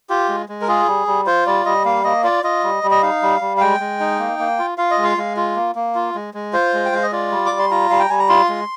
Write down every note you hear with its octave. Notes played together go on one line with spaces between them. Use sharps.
F4 G4
G#3
G#3
A#4
F4 G#4
G3
G3
F4 C5
G3 D5
G3 D#5
A#3 F5
A#3 D#5
F4 D5
F4 D#5
G3
G3
D#5
D#4 F5
G3
G3
F5
G#3 G5
G#3
D#4
A#3
A#3
F4
F4 F5
D#5
G#3
F5
G#3
F4
A#3
A#3
F4
G#3
G#3
F4 C5
G#3
G5
G#3 F5
D#5
F4 D5
G3
D6
G3
C6
F4 A#5
G3 F5
G5
G3 G#5
A#5
F4 C6
G#3